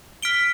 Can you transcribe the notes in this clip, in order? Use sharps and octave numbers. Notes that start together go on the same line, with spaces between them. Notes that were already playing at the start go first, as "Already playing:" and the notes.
F6 B6 D7 G7